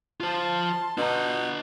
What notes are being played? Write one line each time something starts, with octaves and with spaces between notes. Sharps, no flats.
F4 C5 A5 C6
B2 D4 A#5